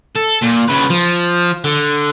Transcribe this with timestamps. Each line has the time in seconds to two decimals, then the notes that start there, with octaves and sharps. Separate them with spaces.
0.16 A4
0.42 A#2
0.68 C#3 B4
0.91 F3
1.65 D3